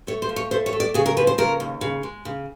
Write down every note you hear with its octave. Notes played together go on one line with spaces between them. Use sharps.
A3 C#5
C5
F3
C#5
A3 C5
C#5
A3
D5
C#3 G#4
A#4
F3 B4
C5
C#3 A#4
D#2
C#3
G#3
C#3